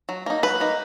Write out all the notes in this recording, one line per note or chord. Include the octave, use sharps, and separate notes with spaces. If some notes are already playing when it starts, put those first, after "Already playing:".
F#3
A#3 D#4
F#3 B4
A#3 D#4